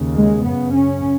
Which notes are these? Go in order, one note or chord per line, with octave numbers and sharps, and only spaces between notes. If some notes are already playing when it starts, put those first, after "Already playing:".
Already playing: D#2 C#3
G#3
F#2 C#3 B3
C#4